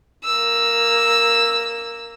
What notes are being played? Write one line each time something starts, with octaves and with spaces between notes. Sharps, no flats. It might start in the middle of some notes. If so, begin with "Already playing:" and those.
A#3 E6